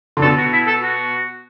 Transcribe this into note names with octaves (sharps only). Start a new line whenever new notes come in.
D3
B2 A4
F#4
E4
A4
F#4